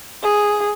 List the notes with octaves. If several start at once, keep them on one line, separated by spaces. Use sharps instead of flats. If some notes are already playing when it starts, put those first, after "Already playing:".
G#4